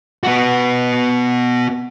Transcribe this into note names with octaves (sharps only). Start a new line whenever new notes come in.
B3 F#4